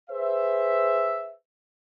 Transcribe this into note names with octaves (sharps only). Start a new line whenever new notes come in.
G#4 B4 C5 E5